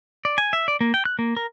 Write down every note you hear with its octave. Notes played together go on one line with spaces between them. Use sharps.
D5
G#5
E5
D5
A#3
G5
F#6
A#3
A#4